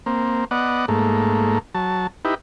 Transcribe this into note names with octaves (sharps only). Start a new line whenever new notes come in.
A#3 C4
B3 D5 D#5 F#5
G#2 A3 A#3
F#3 A5
D#4 E4 G4 B4